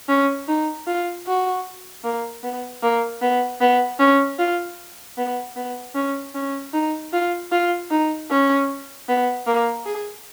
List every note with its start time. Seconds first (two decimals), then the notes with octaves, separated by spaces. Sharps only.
0.08 C#4
0.48 D#4
0.87 F4
1.26 F#4
2.04 A#3
2.43 B3
2.82 A#3
3.22 B3
3.61 B3
3.99 C#4
4.39 F4
5.17 B3
5.56 B3
5.95 C#4
6.34 C#4
6.73 D#4
7.13 F4
7.51 F4
7.91 D#4
8.30 C#4
9.08 B3
9.47 A#3
9.86 G#4